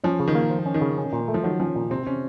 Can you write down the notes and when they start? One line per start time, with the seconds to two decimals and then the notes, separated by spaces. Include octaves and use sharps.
0.04 F3 C#4
0.20 C#3
0.28 D#3
0.35 A#3
0.50 F3
0.66 C#4
0.74 D#3
0.81 C#3
0.98 C#4
1.13 A#2
1.28 A3
1.34 F3
1.44 D#3 F#3
1.60 F3 C#4
1.76 A#2
1.90 C3 C4
2.06 C3 C#4